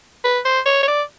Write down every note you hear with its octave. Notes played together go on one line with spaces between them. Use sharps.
B4
C5
C#5
C#5
D5